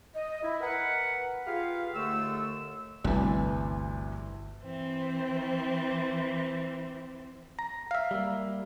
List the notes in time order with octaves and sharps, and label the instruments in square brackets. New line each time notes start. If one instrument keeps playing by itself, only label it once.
[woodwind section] D#5
E4
A#4 B4 F#5
F4 G4 G#4 B4 F5
D#2 D3 A3 E6
[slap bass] G1 G3 [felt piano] D2 C3 E3
[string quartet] E3 C4
[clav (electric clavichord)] A#5
E5 F5
[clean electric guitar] G3 A#3